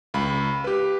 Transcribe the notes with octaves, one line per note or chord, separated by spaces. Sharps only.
C#2 B5
G4 B4